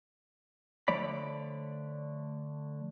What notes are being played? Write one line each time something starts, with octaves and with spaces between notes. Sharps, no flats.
D3 F3 A3 C#5 D5 B5